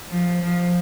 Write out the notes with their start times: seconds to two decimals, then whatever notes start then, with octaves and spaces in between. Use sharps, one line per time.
0.10 F3
0.42 F3